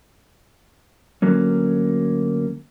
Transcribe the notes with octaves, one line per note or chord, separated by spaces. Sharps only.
D2 F#3 A#3 C#4